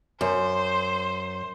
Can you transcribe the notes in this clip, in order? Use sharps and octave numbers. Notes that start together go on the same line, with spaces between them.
F#2 C5